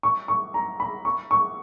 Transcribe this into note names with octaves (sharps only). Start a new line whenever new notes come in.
C#6
C#6
A#5
B5
C#6
C#6